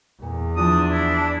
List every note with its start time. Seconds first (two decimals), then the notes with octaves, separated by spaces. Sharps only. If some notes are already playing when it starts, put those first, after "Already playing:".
0.22 E2 A#2
0.57 E3 F3 D4 D#6
0.92 E4